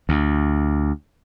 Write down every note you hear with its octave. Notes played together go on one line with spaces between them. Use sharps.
D2